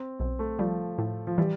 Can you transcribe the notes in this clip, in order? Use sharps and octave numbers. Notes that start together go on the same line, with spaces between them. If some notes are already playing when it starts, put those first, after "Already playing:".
Already playing: C4
B1 C4
A3
F3 G3
A2
F3
E3 G3